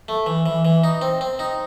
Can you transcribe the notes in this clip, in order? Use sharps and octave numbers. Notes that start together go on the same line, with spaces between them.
A3
E3
E3
E3
D#4
C4
C4
D#4